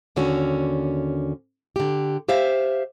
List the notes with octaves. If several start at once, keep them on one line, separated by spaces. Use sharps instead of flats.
D#2 D3 C#4 F#4
D3 G4
G4 C5 E5 F5